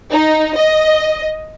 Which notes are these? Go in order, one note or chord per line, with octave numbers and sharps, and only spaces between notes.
D#4
D#5